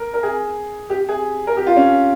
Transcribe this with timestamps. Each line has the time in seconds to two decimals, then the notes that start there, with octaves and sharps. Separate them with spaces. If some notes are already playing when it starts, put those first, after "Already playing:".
Already playing: A#4
0.14 A#4
0.23 G#4
0.90 G4
1.09 G#4
1.47 A#4
1.57 G4
1.66 F4
1.76 C#4